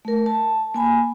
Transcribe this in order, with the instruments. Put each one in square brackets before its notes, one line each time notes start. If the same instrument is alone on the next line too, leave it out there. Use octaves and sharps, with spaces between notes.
[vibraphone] A3 A#4
A5
A#3 G#5 B5